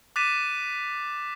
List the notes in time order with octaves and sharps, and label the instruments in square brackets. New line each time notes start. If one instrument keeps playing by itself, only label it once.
[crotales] D6 F#6 A6 B6 D#7 E7